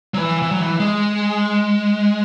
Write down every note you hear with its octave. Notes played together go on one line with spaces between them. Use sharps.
F#3
E3
E3
F#3
E3
G#3